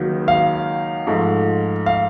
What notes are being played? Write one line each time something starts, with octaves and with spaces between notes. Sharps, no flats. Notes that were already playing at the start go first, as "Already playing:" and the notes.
Already playing: C#2 D#3 F#3 A#3
F5
G#2 F3 A3
F5